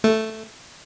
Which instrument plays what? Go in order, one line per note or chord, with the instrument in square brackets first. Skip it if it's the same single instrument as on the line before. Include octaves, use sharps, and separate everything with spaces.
[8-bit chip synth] A3